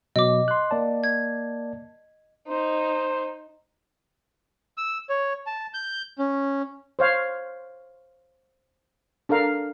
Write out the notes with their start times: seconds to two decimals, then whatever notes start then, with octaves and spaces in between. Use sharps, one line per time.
0.16 B2 F#3 D#5 D6
0.48 C6 F#6
0.71 A#3 D5 A5
1.04 G#6
2.48 D#4 C5
4.77 E6
5.09 C#5
5.47 A5
5.74 G6
6.19 C#4
6.99 C5 C#5 F5
9.29 D4 A4 A#4 F5